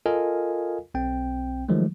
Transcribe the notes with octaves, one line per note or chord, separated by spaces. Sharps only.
F4 A4 A#4 D#5 F5 G#5
B1 C4 G5
D#3 F3 F#3 G#3 A3